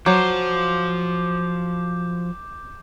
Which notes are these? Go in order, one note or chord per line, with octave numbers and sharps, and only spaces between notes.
F3 F#3 C5 D6 G6